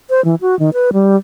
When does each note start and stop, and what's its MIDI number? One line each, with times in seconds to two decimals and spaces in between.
0.10 0.23 72
0.25 0.35 52
0.41 0.57 66
0.59 0.70 51
0.73 0.90 71
0.93 1.16 55